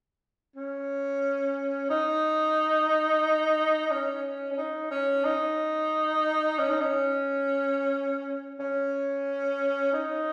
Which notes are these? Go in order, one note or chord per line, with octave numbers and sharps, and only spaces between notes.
C#4
D#4
C#4
C#4
D#4
C#4
D#4
C#4
D#4
C#4
C#4
D#4